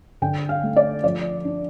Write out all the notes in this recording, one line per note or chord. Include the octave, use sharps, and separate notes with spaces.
D3 G5
F5
A3
D5
F3 D5
D4